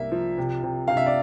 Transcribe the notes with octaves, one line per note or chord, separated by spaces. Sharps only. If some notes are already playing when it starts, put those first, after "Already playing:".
Already playing: C2 A#3 E5
F3
C3
C3
C3 F5
E5
D5